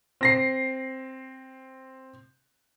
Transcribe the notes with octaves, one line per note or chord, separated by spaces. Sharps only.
C4 A#6 C7